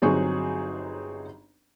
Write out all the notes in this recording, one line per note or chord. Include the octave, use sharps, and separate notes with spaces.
G1 F#3 C4 D#4 G#4 C#6